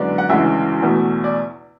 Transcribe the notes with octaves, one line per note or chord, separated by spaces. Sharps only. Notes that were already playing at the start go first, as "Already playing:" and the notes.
Already playing: F#2 D3 G#3 B3 D5
F#5
D2 C#3 E3 G#3 E5
E2 B2 A3
D5